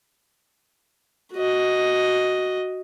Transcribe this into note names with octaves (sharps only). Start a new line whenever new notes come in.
F#4 D#5